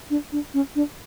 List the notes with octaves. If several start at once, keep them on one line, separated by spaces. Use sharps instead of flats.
D4
D4
C#4
D4